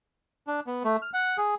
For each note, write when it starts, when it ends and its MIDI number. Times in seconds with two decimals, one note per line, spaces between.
0.47 0.60 62
0.67 0.83 59
0.84 0.96 57
1.02 1.10 89
1.13 1.37 78
1.38 1.55 68